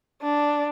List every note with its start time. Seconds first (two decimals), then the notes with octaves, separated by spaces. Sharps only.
0.22 D4